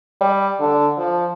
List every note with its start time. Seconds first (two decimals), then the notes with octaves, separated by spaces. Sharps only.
0.21 G3
0.60 D3
0.98 F3